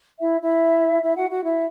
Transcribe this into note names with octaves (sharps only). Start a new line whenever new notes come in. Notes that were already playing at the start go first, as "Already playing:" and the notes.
E4 E5
E4 E5
E4 E5
F#4 F#5
F#4 F#5
E4 E5